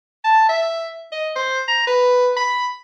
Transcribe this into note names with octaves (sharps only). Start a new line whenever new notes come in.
A5
E5
D#5
C5
A#5
B4
B5